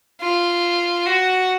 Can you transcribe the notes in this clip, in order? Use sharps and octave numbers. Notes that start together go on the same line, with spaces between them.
F4
F#4